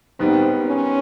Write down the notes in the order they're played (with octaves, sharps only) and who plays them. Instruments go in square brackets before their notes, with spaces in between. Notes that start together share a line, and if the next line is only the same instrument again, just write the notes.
[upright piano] G#2 D#3 G3 B3 [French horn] C4
[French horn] C#4